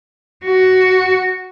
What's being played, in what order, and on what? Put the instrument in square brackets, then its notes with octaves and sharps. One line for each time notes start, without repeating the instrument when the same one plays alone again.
[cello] F#4